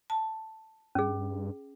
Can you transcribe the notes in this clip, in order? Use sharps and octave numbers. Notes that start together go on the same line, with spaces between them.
A5
G2 C#4 G#4